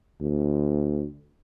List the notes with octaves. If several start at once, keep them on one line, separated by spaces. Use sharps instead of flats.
D2